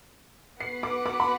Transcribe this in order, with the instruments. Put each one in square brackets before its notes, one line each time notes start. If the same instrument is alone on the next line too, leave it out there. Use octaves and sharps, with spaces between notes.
[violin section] B3 F#4 B4 F#5 [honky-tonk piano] C7
[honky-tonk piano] D6
D6
B5